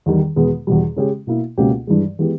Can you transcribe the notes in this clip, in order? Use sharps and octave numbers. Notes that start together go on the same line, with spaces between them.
E2 D#3 G3
E2 B2 G#3 B3
E2 B2 G3
C#3 G#3 C#4 G4
B2 A#3 E4
C#2 B2 A#3 C#4 G4
G2 E3 G#3
E3 G#3 B3 G4